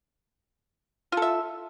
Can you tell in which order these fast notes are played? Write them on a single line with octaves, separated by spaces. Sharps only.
F4 A4 E5